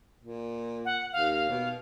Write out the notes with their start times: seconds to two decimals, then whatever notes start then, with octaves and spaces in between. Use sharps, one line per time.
0.21 A#2
0.85 F#5
1.12 D#2 F5
1.34 F5
1.49 B2